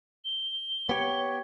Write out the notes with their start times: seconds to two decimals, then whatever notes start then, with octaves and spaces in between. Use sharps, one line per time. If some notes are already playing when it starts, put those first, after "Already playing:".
0.25 G7
0.89 B3 G4 C#5